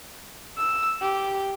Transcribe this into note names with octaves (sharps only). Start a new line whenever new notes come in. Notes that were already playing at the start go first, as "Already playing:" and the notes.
E6
G4